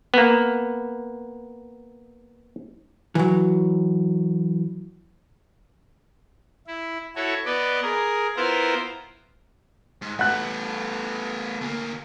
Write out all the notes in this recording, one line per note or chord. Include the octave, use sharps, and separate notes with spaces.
A#3 B3
E3 F#3
E4
E4 F#4 A4 C#5
B3 B4 D5 D#5
G#4 A#4
B3 E4 F4 A#4 C5 A#5
G#2
A3 B3 F#5 F#6
D2 A#3